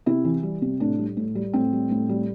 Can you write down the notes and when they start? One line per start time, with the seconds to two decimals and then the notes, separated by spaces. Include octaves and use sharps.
0.06 C3 E4
0.24 E3
0.43 G3
0.62 C3
0.80 A2 D4
0.99 G3
1.17 A2
1.35 G3
1.53 A2 C4
1.73 G3
1.91 A2
2.09 G3